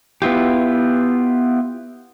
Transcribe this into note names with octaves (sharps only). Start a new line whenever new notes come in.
B3 E4 F4 G4